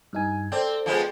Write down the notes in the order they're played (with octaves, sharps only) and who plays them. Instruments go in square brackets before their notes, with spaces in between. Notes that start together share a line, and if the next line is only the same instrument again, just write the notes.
[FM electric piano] G2 D#4 G#5
[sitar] C4 [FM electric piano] A4 D5 G5
[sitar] F3 G#3 B3